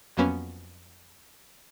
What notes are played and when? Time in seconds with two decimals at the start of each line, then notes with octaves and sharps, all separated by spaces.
0.17 F2 F#3 A#3 B3 C#4